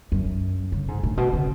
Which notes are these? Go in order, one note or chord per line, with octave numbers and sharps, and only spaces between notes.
F#2
C#3
G#2
A2
B2
C#3